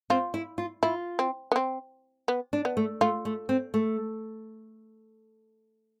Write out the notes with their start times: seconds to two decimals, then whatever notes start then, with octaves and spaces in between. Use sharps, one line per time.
0.10 C4 F4
0.34 E4
0.58 F4
0.83 E4 F4
1.19 C4
1.52 B3
1.56 C4
2.28 B3
2.53 D4
2.65 B3
2.77 A3
3.01 A3 F4
3.25 A3
3.49 C4
3.74 A3